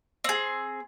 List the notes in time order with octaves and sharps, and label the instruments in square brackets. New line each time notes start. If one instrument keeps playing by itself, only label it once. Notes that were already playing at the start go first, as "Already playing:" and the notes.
[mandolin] C4 G#4